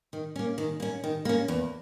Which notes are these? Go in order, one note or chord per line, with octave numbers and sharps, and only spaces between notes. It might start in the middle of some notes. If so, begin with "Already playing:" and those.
D#3
A#3 C#4
D#3
A#3 C#4
D#3
A#3 C#4
E2